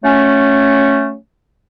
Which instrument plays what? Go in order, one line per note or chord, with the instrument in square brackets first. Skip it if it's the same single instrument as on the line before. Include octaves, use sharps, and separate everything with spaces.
[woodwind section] F#3 A3 C#4